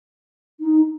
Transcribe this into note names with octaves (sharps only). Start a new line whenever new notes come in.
D#4